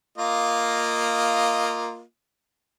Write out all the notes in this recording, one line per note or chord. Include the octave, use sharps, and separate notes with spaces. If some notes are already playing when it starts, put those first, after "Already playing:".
A#3 F4 D#5